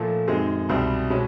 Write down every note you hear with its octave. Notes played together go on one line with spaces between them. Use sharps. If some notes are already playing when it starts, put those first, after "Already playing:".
Already playing: A#2 F3 A3
F#2 D#3 G#3 C4
C2 B2 G3 C4
B2 G#3 C#4